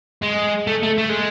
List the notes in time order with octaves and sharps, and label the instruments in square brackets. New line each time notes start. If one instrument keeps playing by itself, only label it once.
[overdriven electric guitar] G#3
A3
A3
A3
G#3